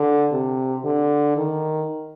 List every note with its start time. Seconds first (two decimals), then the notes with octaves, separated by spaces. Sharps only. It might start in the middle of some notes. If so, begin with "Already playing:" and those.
Already playing: D3
0.32 C3
0.84 D3
1.37 D#3